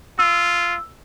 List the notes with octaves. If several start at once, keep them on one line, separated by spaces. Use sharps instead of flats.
F4 E6